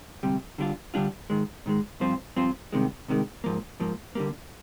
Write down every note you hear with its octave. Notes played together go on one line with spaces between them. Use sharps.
D2 C3 G3
D3 G3 D4 F4
D3 G3 D4 F4
G#2 D#3 G#3
G#2 D#3 G#3
G2 F3 C4 F4 C5
G2 F3 C4 F4 C5
C2 C3 D#3 G#3
C2 C3 D#3 G#3
G#2 F3 A#3
G#2 F3 A#3
D3 G3 A#3